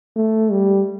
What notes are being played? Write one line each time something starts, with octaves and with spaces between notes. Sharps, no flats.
A3
G3